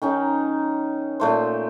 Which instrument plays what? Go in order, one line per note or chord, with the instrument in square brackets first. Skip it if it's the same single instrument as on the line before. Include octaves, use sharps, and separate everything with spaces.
[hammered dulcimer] D#3 C#4 D#4
A#2 A3 C5